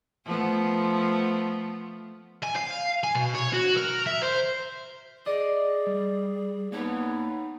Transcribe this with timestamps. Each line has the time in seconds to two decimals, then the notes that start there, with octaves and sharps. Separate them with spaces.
0.24 F3 A3 B3
2.43 G#5
2.56 F5
3.04 G#5
3.15 B2
3.35 C#5
3.53 F#4
3.77 A#4
4.07 E5
4.23 C5
5.26 G#4 D5 D#5
5.87 G3
6.72 A#3 B3 D#4 C#5